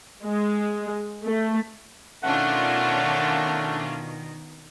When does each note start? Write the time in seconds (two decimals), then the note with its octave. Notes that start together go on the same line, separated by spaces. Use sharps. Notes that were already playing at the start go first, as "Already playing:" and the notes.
0.23 G#3
1.24 A3
2.23 B2 D#3 A3 C#4 D4 F4 F#5